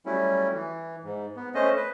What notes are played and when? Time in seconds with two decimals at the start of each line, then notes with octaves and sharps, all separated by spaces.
0.06 F#3 G3 A3 C#4 E4
0.53 E3
1.04 G#2
1.36 B3
1.55 A3 C#4 C5 D#5
1.76 B4